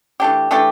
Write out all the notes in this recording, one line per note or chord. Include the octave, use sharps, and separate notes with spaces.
E3 A3 D4 G4
E3 A3 D4 G4